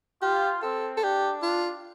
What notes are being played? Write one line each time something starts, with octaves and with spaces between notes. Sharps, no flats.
F4 G4
C4 A4
A4
D4 G4
F4